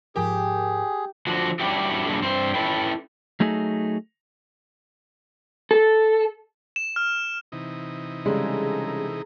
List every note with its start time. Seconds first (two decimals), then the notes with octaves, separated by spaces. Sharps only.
0.16 G#2 F3 G4 G#4 A#4
1.27 D3 F3 F#4
1.59 G3 C#4 D4 E4 F#4 G4
2.06 F#3 G3 A3 A#3 D4 G#4
2.22 G2 C4 C5
2.54 C#4 E4 A4 B4 G5
3.40 F#3 A3 D#4 G#4
5.71 A4
6.76 E7
6.96 F6
7.52 C3 E3 D#4
8.26 C#3 G3 G#3 G#4 A4 A#5